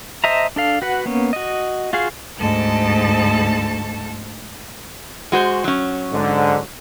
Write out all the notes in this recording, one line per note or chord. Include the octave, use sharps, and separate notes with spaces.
C5 D#5 E5 A5 A#5
D4 A4 F5
F#4 B4 F#5
A#3 B3 C#4
F#4 D#5
F4 F#4 G#4 F5
D2 G#2 A4 A5
G#3 F#4 C5
F#3 C#4
G#2 D3